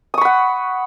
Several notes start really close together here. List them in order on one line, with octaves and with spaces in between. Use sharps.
D#6 C#6 B5 F#5